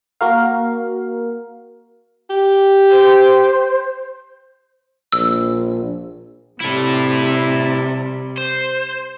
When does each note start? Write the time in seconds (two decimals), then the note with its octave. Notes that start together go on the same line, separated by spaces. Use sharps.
0.21 A#3 F#4 A#4 F5
2.30 G4
2.91 C5
5.12 A#1 E6
6.60 C3 G3 E4 A4
8.38 C5